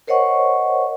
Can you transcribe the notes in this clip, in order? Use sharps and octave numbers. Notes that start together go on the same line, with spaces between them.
A#4 C5 C#5 D#5 F#5 C#6